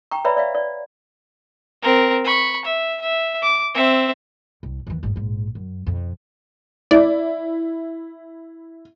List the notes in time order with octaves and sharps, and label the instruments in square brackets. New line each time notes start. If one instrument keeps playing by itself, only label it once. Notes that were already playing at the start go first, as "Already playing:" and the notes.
[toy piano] G5 A#5 C#6
B4 C#5 D5 E5 A#5 B5
D5 E5 F5
D5
[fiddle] C4 A#4
B5 C#6
E5
E5
D6
C4 E5
[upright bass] C2
D#2 E3
G#1 B3
A#1 G#2
F#2
F2 B2
[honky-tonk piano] E4 [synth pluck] D5